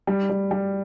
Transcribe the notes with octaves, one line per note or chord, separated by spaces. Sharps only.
G3
G3
G3